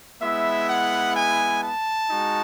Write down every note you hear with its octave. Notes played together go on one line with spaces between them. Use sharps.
G#3 B3 E4 E5
F#5
G#5
A5
G#3 D#4 F#4